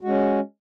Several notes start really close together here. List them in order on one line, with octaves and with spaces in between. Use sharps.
F#4 G#3 C#4